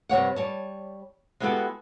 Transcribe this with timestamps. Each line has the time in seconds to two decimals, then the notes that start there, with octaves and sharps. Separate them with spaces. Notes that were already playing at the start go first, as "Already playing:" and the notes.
0.09 G2 C3 C#5 F#5
0.36 G3 C#5 A5
1.40 G#3 B3 E4 F#4 G4 A4